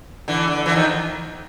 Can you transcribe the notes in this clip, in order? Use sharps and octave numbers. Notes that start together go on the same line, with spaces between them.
D3 E3
D3
D3 E3
D#3 F3